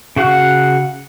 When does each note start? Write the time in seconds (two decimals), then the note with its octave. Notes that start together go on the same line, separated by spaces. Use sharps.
0.16 C#3 F#4 F5 F#5 F#6